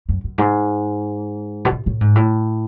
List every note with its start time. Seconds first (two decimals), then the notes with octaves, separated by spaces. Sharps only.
0.09 F#2
0.24 F#2
0.38 G#2
1.65 B2
1.72 A2
1.86 A2
2.01 G#2
2.16 A2